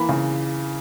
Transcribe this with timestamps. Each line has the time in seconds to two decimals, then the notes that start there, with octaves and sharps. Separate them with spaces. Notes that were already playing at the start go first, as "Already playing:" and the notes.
Already playing: E3 A#3 B5
0.09 C#3